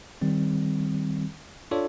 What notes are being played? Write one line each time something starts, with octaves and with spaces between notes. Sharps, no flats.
D#3 G3 C4
D4 F4 A4 C#5 D5